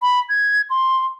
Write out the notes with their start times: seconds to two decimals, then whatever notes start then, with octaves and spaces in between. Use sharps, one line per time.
0.02 B5
0.29 G#6
0.70 C6